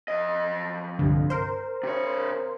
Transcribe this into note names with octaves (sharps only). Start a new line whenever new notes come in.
F2 D#5
C2 G2 D3
A#4 C5
C3 C#5